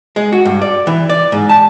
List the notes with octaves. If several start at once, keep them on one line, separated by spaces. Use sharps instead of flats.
G#3
F#4
G2
D5
E3
D5
G#2
A5